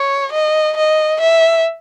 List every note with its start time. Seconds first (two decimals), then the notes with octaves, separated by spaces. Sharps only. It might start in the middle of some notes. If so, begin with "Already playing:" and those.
Already playing: C#5
0.32 D#5
0.77 D#5
1.21 E5